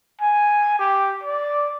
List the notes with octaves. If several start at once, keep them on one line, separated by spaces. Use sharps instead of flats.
G#5
G4
D5